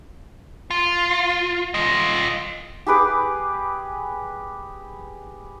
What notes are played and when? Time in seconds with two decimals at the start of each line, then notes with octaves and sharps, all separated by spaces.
0.71 F4
1.74 F4 D#5
2.86 G4 G#4 B4 D6